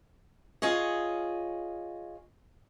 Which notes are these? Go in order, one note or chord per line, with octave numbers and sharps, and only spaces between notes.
F4 G#4 C#5 D#5